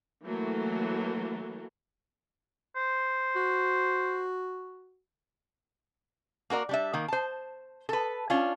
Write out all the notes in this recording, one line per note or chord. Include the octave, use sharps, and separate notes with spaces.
E3 F#3 A3 A#3
C5
F#4
A#3 F#4 A#4 D5
G3 D4 E5
D#3 A#3
C5 A5
A4 B4
C#4 D4 F4